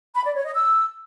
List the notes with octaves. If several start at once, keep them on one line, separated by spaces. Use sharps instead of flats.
B5
D5
C#5
D#5
E6